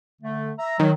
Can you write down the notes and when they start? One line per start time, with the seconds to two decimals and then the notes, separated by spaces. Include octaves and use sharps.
0.22 D3 A3
0.59 E5 A#5
0.79 D#3 F#3